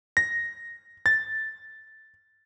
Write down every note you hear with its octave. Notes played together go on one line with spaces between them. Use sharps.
A#6
A6